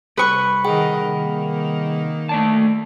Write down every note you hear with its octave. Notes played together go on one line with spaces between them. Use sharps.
C2 B4 C#6
D#3 G#4 A#4 D#5 F#5 G5
D#3 A#3 D#4
A3 D5 A5